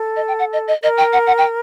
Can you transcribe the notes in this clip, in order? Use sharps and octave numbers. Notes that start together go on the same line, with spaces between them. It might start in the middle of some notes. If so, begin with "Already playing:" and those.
Already playing: A4
D#5
G5
F#5
D#5
D#5
A#4 D#5
G5
F#5
F#5
G5